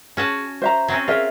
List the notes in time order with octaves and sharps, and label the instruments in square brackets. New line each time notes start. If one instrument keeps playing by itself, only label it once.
[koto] C#4 F#4 A5 [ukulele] G#4
[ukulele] C5 E5 A#5
[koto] F#3 C4 C#4
[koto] F4 [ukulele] G#4 A#4 E5